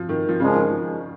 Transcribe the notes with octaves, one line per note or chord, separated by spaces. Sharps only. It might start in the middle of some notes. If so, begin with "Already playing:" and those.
Already playing: F3
D#3
F3
A#2 C#3 F3 G#3 C#4 G#4
D#3
F3